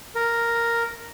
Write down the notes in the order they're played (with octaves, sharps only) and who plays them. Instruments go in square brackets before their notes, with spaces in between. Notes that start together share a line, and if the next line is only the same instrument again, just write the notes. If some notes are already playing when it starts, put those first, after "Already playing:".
[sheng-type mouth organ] A#4